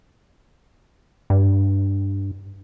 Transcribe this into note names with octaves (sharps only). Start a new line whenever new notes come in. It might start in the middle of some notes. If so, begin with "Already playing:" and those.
G2